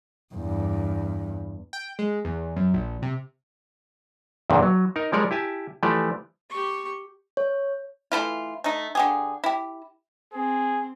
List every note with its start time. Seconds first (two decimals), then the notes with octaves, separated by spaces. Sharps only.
0.35 E2 G2
1.73 G5
1.99 G#3
2.25 E2
2.56 F#2
2.74 A#1
3.02 C3
4.50 E2 G2 A#2 D3 D#3
4.63 F#3
4.96 D#4 A#4
5.12 F3 G3 G#3 A#4 C#5 D5
5.31 E4 G4 G#5 A5
5.83 E3 F3 A3 G4 D5
6.50 G4 C#6
7.37 C#5
8.12 E3 A3 E4 F4
8.64 A3 D#4
8.95 D3 G4 G#4
9.44 E4 G4
10.33 C4 G#4